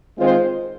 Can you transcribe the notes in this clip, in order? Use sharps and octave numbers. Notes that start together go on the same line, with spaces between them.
D#3 G#3 C4 F4 C5